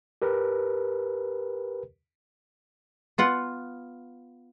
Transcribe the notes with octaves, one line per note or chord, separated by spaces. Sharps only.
G4 A#4 B4
B3 F4 F#5